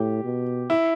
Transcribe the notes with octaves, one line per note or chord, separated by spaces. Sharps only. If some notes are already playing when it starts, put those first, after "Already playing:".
Already playing: A2 G4
B2
E4